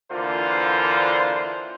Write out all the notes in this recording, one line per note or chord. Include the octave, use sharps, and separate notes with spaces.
D3 E3 A#3 D4 F4 C5